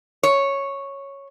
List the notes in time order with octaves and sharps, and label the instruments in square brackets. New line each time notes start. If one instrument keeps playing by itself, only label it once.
[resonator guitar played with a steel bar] C#5